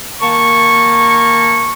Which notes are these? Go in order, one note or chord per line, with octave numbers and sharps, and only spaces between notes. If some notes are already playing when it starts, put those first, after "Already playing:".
D#3 A#3 A5 C#6